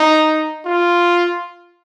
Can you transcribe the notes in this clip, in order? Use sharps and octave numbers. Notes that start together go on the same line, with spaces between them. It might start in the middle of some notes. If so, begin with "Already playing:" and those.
Already playing: D#4
F4